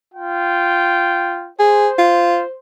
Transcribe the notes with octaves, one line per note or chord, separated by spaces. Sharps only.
F4 G5
G#4 C5
F4